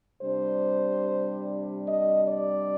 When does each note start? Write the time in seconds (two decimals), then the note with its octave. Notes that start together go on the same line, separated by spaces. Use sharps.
0.22 C3 G3 D4 C5
1.85 D#5
2.26 D5